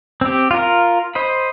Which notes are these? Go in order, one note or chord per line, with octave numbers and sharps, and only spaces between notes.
C4 G4
F4 A#4
C5 D#5 B5